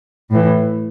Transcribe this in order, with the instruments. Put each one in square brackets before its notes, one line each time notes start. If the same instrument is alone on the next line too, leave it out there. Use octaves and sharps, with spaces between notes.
[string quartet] A2 E3